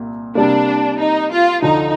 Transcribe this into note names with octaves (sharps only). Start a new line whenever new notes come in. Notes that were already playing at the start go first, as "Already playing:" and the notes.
Already playing: C2 A#2
C3 G3 A#3 D4
D#4
F4
D2 D3 F3 D#4